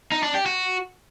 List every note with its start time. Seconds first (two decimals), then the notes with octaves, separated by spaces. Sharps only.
0.12 D#4
0.23 D4
0.35 G4
0.46 F#4